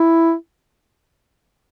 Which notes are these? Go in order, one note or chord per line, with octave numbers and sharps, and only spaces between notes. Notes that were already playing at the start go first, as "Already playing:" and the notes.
Already playing: E4